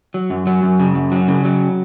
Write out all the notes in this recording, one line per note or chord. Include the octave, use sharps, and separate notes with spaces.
F#3
F#2
F#3
F#2
C#3
F#2
F#3
C#3
F#3